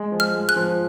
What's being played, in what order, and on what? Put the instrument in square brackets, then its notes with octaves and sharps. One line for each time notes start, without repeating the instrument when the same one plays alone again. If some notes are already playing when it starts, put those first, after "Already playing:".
Already playing: [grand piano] G#3
F3
[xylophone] F6
[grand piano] G#3
[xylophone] F#6
[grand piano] F3